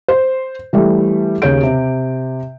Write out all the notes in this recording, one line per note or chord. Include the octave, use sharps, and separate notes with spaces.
C5
E3 G3 A3
D#2 C#3 C#5 G6 D7
C3